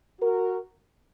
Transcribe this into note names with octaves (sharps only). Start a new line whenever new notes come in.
F#4 A#4